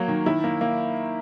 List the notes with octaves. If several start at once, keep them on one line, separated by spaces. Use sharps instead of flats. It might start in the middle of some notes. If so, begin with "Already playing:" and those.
Already playing: F#3 A#3 C#5
D#3
D#3 E4
A#3
A#3